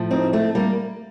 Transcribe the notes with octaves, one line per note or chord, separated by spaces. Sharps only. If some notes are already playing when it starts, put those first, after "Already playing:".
Already playing: A2 F3
C4 D#4
A3 C4
G3 A#3